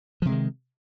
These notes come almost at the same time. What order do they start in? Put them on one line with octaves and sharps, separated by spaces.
F3 C3 G#3 D#3